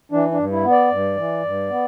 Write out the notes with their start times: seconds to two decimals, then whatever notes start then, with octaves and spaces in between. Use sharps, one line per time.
0.12 E3 D4
0.31 D4
0.38 G2
0.52 E4
0.64 B3
0.71 D5
0.91 G2
1.17 E3
1.44 G2
1.70 B3